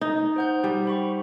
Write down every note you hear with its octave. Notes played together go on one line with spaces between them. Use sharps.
D#4
C5 F#5 G6
G3
C5 B5 C#6